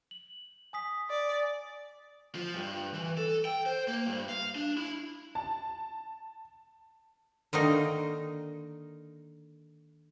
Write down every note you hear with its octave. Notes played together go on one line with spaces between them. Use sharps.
F#7
G#5 D#6 B6
D5
F3
G2
E3
A4
G5
C5
A#3
G2
F5
D4
E4
A5
D3 D#3 A#3 D#4